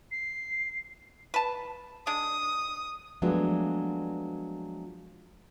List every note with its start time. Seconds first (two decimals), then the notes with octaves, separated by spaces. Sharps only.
0.11 C7
1.34 B4 A5
2.07 G#3 D4 D#6
3.22 F3 F#3 G#3 A3 B3 D4